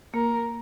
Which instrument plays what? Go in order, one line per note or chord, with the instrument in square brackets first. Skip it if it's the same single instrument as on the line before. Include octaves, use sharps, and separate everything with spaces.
[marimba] A#3 [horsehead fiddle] A#4